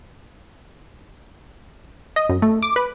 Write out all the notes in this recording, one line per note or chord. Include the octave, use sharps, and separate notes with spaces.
D#5
F#2
A3
D6
B4